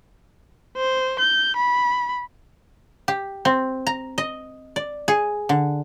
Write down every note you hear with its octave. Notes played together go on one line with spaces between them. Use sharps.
C5
G6
B5
G4
C4
A#5
D#5
D5
G#4
D3